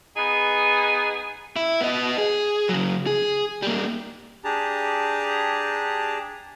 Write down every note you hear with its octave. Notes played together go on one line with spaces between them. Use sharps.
B3 D#4 G#4
E4
B3 D#5
G#4
C#3 F#3
G#4
G3 A#3
D4 G4 G#4 A5 A#5